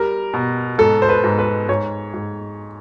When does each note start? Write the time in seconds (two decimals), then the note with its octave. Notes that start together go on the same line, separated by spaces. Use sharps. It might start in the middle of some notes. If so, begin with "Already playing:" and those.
Already playing: G3 A#4
0.34 B2
0.78 G#2 A4
1.02 C5
1.09 B4
1.24 G#2
1.39 B4
1.69 G#2 C#5
2.14 G#2